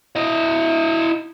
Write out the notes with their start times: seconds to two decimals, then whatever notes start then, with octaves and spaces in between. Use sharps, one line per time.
0.16 E4 D#5